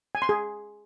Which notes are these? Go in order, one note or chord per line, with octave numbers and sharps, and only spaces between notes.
G#5
C6
G#4